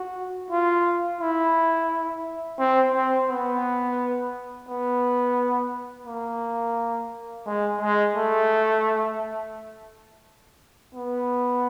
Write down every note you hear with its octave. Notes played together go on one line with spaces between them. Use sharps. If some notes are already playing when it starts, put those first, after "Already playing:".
Already playing: F#4
F4
E4
C4
C4
B3
B3
A#3
G#3
G#3
A3
B3